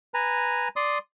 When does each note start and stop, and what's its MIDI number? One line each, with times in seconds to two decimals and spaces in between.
0.14 0.68 71
0.14 0.68 80
0.14 0.68 82
0.76 0.98 74
0.76 0.98 84
0.76 0.98 87